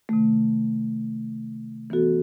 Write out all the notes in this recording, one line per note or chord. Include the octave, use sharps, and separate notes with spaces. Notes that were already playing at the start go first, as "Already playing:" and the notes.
C3 D#3 A3
E3 B3 F#4 A4